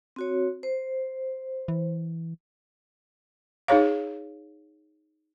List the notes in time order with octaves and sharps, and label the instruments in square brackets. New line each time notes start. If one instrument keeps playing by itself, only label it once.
[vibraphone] C4 F#4 C#5
C5
[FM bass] E3
[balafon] D#4 G#4 C#5 F5